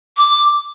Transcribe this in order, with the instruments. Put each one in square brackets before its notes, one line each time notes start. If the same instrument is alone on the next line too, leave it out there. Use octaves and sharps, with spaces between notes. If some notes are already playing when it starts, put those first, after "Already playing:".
[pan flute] D6